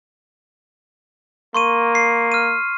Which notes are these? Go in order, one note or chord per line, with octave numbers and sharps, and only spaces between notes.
A#3 C6 C#6 D#7
C7
F6 D#7